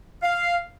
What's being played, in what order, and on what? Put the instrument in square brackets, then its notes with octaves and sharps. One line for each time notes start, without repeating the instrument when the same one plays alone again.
[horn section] F5